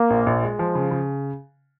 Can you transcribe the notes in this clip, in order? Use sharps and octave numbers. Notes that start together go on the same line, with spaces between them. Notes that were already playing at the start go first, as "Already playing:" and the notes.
Already playing: A#3
A#1
A#1
G#3
F3
C#3
C#3